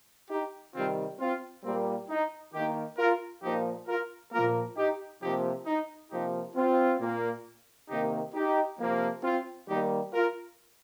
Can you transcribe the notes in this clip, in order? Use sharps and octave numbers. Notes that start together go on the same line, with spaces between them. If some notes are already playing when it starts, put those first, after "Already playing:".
D#4 G4
C3 D#3 G3 C4 F4
C4 F4
A#2 G3 A#3 C4
D#4
D#3 A#3 D#4 G4
F4 A#4
A#2 F3 A#3 D#4 G4
F4 A#4
A#2 F3 A#3 F4 A#4
D#4 G4
C3 F3 A#3 D#4 G4
D#4
C3 F3 A#3 D#4 G4
C4 F4
A#2 A#3
C3 D#3 A#3 D#4 G4
D#4 G4
C3 F3 A#3
C4 F4
D#3 G3 A#3 D#4 G4
F4 A#4